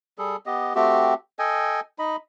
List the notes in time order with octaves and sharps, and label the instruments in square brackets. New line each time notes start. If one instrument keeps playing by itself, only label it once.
[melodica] G3 G#4 A4
B3 G4 D#5
A3 C4 F#4 G4
A4 D#5 G5 G#5
D#4 D#5 B5